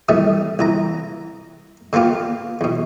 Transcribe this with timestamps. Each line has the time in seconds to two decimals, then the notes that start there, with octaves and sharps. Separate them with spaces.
0.09 C3 D#3 E3 G3 A3
0.59 C2 E3 A#5
1.93 D3 A#3 B3 F4 G4
2.61 E2 B2